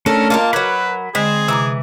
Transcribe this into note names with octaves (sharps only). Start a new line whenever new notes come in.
A3 C#4 D4 A4 A#4
A#3 F4 A#4 D#5 A5
F#3 A#4 B4 B5 D6 G#6
D3 G#3 C4 G#4 D#5
C3 E3 A#5 D6